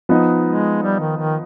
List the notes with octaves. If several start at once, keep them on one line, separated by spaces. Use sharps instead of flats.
F3 B3 D#4
G#3
G3
D#3
D#3